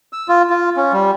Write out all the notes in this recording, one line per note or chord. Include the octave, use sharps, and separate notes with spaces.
E6
F4
F4
C#4
G3